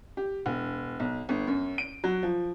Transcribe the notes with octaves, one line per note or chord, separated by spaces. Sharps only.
G4
E1
B1
G1
F#2
D7
F#3
F3